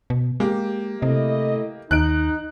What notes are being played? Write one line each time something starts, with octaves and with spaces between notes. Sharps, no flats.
B2
G#3 A#3 G4
C3 A3 E4 D#5
D#2 D#4 F#6 D7